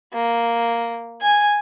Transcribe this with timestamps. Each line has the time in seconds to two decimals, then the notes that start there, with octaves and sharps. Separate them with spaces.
0.14 A#3
1.21 G#5